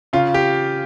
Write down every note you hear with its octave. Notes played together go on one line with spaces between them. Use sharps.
C#3 F4
G4